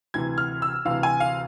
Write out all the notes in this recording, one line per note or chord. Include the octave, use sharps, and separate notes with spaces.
D2 C3 E3 G#6
F6
E6
D2 C3 E3 F5
G#5
F5